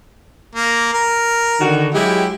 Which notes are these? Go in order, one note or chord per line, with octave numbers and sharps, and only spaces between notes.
A#3
A#4
D3 D#3 F#4
F#3 G#3 E4 G4